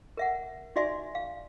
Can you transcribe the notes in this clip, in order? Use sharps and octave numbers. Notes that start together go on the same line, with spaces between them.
A#4 E5 F#5
D#4 F#4 D5 E5 G#5 C6
F5